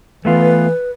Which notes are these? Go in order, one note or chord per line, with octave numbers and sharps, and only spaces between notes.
E3 A3 B3 F4 B4